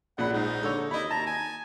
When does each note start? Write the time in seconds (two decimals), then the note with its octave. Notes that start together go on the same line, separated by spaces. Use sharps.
0.18 A#1 A#2 C#3 F#5 B5
0.33 G#2 D#4
0.63 D3 C#5 E6
0.91 D#2 E4 D#5 B5
1.11 A5 A#5
1.27 G#5